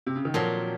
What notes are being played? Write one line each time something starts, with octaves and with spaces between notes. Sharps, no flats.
C3
C#3
D#3
A#2 F3 F#3 C4